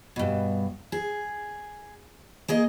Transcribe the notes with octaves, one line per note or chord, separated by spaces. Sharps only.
G2 B2
G#4
A#3 G#4 D#5